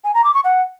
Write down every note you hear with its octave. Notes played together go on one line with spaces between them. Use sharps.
G#5
A#5
D6
C#6
F#5